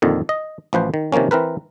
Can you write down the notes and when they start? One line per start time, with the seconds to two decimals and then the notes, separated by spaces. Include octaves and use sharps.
0.02 A#1 F2 D3 D#3
0.29 D#5
0.73 A1 F3 B4 C5
0.94 D#3
1.12 C3 D#3 F3 A#3 C#4
1.31 E3 C4 A#4 B4